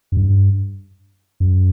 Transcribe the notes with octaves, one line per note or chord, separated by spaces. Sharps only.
F#2
G2
F#2